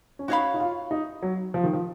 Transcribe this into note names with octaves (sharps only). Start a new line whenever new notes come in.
C#4
D#4 F#4 C#5 F5 B5
D#4
F4
D#4
F#3
F3
D#3
F3